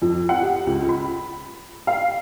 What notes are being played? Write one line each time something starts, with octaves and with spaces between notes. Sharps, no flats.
F2
F#5
G4
C#2
B5
F5